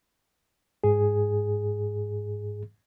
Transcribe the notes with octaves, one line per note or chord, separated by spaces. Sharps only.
G#2 G#4